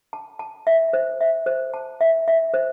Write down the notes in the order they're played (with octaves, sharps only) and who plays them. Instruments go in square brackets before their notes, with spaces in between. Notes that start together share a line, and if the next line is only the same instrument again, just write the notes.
[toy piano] A5
A5
E5
C5
E5
C5
A5
E5
E5
C5